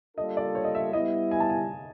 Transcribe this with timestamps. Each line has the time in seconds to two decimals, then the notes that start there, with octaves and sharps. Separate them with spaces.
0.17 G3 A#3 D4 F4 A4 D#5
0.37 D5
0.55 C#5
0.64 D#5
0.75 E5
0.93 G3 B3 E4 D#5
1.31 G#5
1.40 A5
1.50 G#5